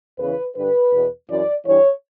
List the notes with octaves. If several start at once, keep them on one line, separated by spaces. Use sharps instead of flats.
E2 C#3 E3 B4
G2 D3 B4
E2 B2
F#2 E3 D5
G2 E3 C#5